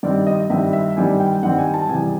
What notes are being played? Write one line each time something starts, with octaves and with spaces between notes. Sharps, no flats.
G2 D#3 G3 C4 D5
D#5
G2 D#3 G3 C4 E5
E5
G2 D#3 G3 C4 G#5
G5
G2 D#3 G3 C4 F#5
G#5
A5
E2 C3 E3 G3 G#5